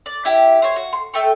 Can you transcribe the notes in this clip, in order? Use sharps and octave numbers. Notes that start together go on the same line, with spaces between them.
D5
E4 G4
C5 C#5
F#4
C6
A3 G5 C#6